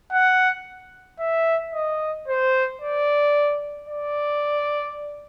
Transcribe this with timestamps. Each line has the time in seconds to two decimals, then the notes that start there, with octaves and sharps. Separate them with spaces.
0.13 F#5
1.20 E5
1.74 D#5
2.28 C5
2.82 D5
3.89 D5